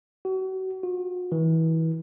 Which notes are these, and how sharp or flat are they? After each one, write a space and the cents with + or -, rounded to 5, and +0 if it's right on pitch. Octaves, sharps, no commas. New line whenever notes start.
F#4 +35
F#4 -45
E3 -30